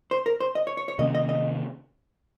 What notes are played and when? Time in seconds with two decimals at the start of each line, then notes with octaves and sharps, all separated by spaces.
0.11 C5
0.26 A#4
0.40 C5
0.55 D#5
0.67 C#5
0.77 C#5
0.88 C#5
0.99 C3 D#3 A#3 C#4 D#5
1.15 D#5
1.29 D#5